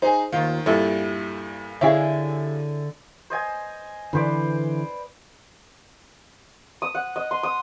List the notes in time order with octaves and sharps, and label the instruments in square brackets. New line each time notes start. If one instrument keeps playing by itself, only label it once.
[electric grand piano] D#4 G#4 G#5 [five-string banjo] C5
[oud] D#2 F4 [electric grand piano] D#3
[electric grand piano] G2 A#2 G3 [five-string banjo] E4 [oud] A4
[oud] D3 E5 F5 [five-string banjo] C#4 E4 G#4
[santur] C5 D#5 G#5
[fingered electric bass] D3 E3 [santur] B4 C5 D5
[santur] D#6
F#5
D#5
C6
D#6